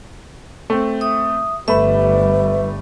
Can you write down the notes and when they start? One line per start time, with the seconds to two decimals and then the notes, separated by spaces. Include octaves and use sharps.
0.70 A3 C4
1.01 E5 D#6
1.68 G1 G3 A3 B4 E5 B5